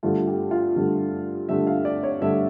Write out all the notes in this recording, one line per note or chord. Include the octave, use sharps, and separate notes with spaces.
G2 D3 A3 F4
G4
F4
G2 D3 A3
G2 D3 A3 E5
F5
D5
C#5
G2 D3 A3 E5